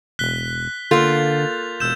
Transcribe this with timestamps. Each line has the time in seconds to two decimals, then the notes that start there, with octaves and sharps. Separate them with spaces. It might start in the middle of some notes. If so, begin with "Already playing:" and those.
0.19 E1 F#6 B6 G7
0.91 D3 A#3 F4 A4 G6 A6 F7
1.80 E1 E6 G6 E7